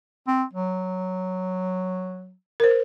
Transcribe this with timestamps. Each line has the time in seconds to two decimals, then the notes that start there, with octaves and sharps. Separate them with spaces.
0.27 C4
0.53 F#3
2.60 A#4 C5